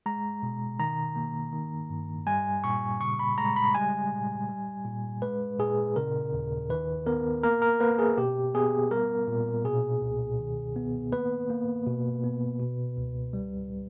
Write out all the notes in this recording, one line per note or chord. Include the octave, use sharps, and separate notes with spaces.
G#3 A#5
B2
D#3 A#5
A#3
D#3
G2
G3 G#5
A#2 C#6
C#3 C#6
B5
G#3 A#5
B5
G3 G#5
A#2
G3
A#2
G#3 B4
A#2 G#4
C#3 A#4
D#2
D#3 B4
B3 A#4
A#3 A#4
A#4
A#3 B4
G#4
B2 G4
B3 G#4
G3 A#4
A#2
B2 G#4
C#2
D#3
B3
A#3 B4
A#3
B2
B3
B2
C#2
G3